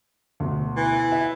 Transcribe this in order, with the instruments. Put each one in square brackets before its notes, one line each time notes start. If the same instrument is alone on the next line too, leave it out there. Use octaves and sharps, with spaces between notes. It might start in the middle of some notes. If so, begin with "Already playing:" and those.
[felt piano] D2 B2
[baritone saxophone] E3
[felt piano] E5